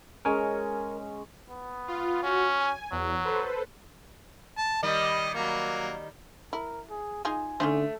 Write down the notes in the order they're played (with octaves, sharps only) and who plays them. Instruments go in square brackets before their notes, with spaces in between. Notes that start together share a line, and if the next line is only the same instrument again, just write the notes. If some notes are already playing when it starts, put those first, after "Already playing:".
[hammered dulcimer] G#3 C#4 [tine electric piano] A#4 C#5 G#5
[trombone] B3
[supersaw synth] F4
[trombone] C#4 [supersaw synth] F#4
[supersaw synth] G#5
[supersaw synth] E2 [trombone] F#3
[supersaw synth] A4 B4 C5
[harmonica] A5
[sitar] D#3 G3 [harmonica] D#5
[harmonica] F#3 A#3
[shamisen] E4 [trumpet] A#4
[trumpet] G#4
[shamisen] D#4 F4 G#4 [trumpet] G#5
[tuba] D3 [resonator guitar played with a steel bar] A3 [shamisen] C#4 D#4 C5